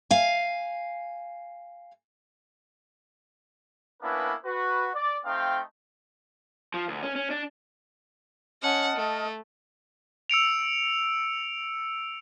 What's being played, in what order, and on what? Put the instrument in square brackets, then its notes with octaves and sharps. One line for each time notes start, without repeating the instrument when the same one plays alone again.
[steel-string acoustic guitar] F5 G#5
[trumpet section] A#3 B3 C#4 D4 E4 B4
F#4 B4
D5
A3 C4 D#4 F5 G5
[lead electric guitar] F3
D2
C#4
C#4
D4
[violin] C#4 F#5 [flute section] D#5 A5 F6
[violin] A3
[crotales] E6 C#7 D7 F7